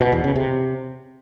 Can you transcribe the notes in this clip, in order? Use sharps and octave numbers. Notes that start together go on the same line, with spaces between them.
B2
E2
C#3
C3